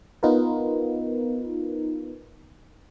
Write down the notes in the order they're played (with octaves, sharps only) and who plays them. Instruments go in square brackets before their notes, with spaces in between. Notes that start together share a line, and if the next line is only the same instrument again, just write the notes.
[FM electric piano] B3 D#4 F4 A#4 B4